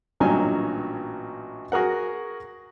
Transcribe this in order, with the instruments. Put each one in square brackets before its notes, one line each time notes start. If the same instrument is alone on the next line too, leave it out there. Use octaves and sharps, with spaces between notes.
[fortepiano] A1 G2 A#2 F#3 D#4 G#5
F#4 G#4 A#4 F#5